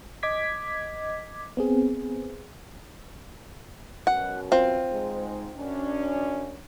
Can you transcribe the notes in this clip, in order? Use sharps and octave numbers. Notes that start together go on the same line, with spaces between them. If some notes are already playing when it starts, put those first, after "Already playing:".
D#5 D6 G#6 B6
B3 C4 G#4
F#2 B2 F#5
C4 F4
G#2 G#3
F#2 C#4 D4